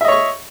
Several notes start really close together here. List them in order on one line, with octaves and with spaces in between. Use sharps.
E5 D#5 C#5 C#6